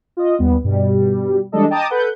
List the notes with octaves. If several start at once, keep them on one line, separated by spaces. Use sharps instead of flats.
F4 D#5
D#2 G3 B3
G2 B2 G3
E3 G3 G#3 D4 A4 D#5
D#5 G5 A5 A#5 D6 D#6
A4 B4 F#5 G6